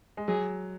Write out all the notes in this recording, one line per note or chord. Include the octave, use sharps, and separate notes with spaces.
G#3
F#3 G#4